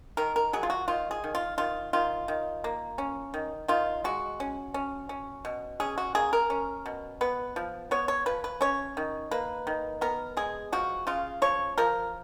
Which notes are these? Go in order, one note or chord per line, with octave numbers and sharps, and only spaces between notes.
D#3 A#4
A#4
F#3 G#4
F4
F#4
D#3 F4
G#4
D#3
F4
D#3 F4
D#3 F4
D#3
A#3
C#4
D#3
D#3 F4
G#3 F#4
C#4
C#4
C#4
B2
C#4 G#4
F#4
A#3 G#4
A#4
C#4
B2
B3 B4
F3
B3 C#5
C#5
F3 B4
B4
C#4 C#5
D#3
A#3 B4
D#3
B3 A#4
G#3 G#4
F3 F#4
C#3 F4
F3 C#5
F3 A#4